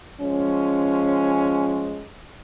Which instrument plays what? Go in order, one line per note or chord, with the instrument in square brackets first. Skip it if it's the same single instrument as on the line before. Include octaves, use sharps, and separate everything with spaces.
[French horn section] F3 G#3 C#4